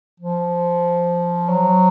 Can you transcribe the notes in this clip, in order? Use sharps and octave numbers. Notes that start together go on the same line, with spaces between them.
F3
F#3